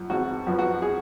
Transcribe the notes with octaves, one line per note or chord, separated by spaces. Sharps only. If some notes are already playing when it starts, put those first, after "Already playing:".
Already playing: F#2 F3
G#1 F#4
F#2 F3 B3
F#4
G#4